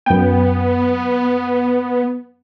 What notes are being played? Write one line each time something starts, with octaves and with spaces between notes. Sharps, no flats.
F#2 B3 G5